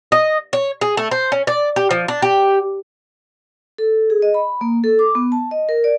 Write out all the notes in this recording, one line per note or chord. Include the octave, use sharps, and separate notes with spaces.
D#5
C#5
G#4
A3
C5
C#4
D5
G4
F3
D4
G4
A4
G#4
D#5
B5
A#3
A4
D6
B3
A5
D#5
A#4
D5